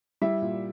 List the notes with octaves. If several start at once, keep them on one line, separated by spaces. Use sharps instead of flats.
G3 E4 E5
A#2